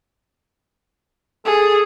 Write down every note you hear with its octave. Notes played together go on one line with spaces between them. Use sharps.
G#4 A4